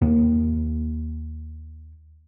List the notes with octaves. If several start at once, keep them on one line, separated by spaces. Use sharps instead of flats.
D#2 A#3